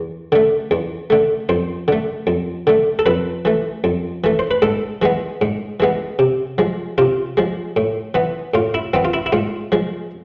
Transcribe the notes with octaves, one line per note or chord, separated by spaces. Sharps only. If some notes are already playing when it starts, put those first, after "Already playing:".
Already playing: E2
D3 A3
E2
D3 A3
F2 C5
D3 A3
F2
D3 A3
A4
F2 B4
E3 A3
F2
E3 A3
C5
B4
G#2 A4
E3 G#3 B3
G#2
E3 G#3 B3
C3
F3 G#3
C3 F4
F3 G#3
A2
E3 B3
A2 F4
E4
E3 B3 C4
F4
E4
E4
G#2 F4
F3 G#3